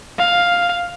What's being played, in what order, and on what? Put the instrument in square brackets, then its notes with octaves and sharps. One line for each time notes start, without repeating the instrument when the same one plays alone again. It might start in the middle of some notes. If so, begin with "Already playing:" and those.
[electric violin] F5